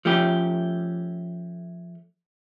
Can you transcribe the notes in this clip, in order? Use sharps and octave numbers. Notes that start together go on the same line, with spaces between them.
F3 A3 C#4 G4